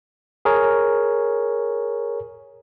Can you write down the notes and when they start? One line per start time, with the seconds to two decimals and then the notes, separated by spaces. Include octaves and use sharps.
0.45 G#4 A#4 C#5